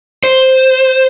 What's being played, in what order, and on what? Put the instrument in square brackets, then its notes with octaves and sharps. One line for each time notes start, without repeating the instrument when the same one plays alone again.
[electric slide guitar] C5